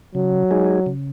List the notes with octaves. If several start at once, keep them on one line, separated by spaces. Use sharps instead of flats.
C#3 F#3
G#3 D#4 G#4
C#3